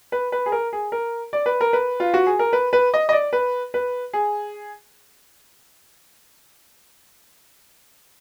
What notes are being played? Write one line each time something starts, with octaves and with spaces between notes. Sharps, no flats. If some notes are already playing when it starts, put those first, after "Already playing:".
B4
B4
G#4
A#4
G#4
A#4
D5
B4
A#4
B4
F4
F#4
G#4
A#4
B4
B4
D#5
D#5
D5
B4
B4
G#4